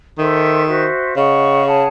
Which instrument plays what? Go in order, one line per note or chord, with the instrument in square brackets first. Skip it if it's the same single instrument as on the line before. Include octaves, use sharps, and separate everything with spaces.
[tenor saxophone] D#3 [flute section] A4 C5 E5 C6
[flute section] F#4 C5 E5
[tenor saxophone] C#3 [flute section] G#4 D#5 F#5 C#6
[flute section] G#4 C#5 F#5 A5